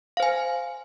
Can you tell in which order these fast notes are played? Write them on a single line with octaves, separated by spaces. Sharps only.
F5 C5 G#5